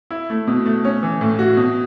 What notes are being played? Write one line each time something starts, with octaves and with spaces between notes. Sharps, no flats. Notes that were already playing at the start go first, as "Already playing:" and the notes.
E4
A3
B2
A3
C#4
E3
A2
F#4
B2